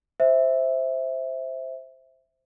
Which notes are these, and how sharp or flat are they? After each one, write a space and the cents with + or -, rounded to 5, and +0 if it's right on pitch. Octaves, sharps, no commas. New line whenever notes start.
C5 +0 E5 -5